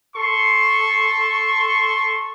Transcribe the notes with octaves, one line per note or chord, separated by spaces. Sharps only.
A4 C6 C#6